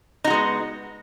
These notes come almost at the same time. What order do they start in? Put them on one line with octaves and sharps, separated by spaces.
D#4 F#4 G#3 B3